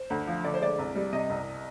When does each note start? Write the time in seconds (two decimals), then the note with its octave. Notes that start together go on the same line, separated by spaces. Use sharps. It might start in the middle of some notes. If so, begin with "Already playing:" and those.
Already playing: C5
0.10 D2
0.27 F3
0.44 D3 D5
0.54 C5
0.61 G#3 D5
0.79 C2
0.96 G3
1.13 C3 D#5
1.30 C2